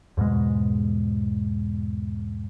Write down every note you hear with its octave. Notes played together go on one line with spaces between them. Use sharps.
E2 G#2 B2 G#3